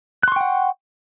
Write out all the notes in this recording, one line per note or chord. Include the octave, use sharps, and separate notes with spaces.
F#5 G5 C6 C#6 F#6